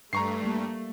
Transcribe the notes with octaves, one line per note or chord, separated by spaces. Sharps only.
G2 A3 A#5 C#6 C7
G3 A#3